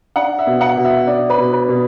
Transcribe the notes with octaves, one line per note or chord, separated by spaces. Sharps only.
D4 F#5
E5
B2
F#5
B2
E5
D4 D5
B4
B2
B4
B2